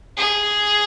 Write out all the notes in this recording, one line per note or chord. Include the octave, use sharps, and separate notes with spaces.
G#4